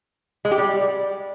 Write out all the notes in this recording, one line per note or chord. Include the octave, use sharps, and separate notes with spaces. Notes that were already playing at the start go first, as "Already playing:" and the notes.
G#3
G4
G3